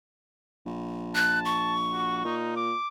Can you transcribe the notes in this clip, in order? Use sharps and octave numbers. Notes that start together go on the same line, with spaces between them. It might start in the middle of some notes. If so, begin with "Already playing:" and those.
A#1
A5 F#6
C#6
F#4
A#2 D#4
D6